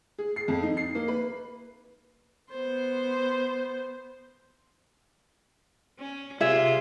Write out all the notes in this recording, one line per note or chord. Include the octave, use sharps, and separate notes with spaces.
G#4
C7
F2
D#4
C7
A#3
B4
B3 C5
C#4
C3 F4 G#4 E5